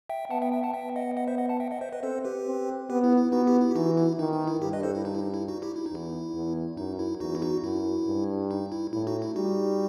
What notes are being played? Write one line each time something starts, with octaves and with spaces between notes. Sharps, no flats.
E5 G5
B3 F#5 A5
E5 G5
E5 G5
F#5 A5
B3 E5 G5
D#5 F#5
D#5 F#5
C5 E5
D#5 F#5
F#5 A5
E5 G5
D#5 F#5
C5 E5
B4 D#5
C4 A4 C5
G4 B4
C4
B3 G4 B4
E4
E4
B3 D#4 F#4
E4 G4
E4
G4
E3 D#4 F#4
E4
D#3 D#4
D#4
E4
G2 E4 G4
B4 D#5
A4 C5
E4
D#4
E4
D#4
E4
D#4 F#4
E4 G4
E4
D#4
E2 E4
E2
F#2 D#4
E4
E2 D#4 F#4
E4
D#4 F#4
F#2 E4
G2
D#4
E4
A2 E4
D#4 F#4
E4
G3 D#4 F#4